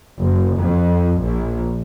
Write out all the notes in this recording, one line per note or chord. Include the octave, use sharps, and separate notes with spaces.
F#1
F2
A#1